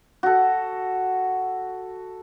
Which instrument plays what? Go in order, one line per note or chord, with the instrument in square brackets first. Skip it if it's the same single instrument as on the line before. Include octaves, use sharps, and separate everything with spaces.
[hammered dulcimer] F#4 A4